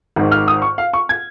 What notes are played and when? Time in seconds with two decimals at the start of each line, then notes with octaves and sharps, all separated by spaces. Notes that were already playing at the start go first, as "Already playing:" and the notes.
0.16 G#1 G#2 D#3
0.31 F6
0.48 D#6
0.62 C#6
0.78 F5
0.93 C#6
1.09 G#6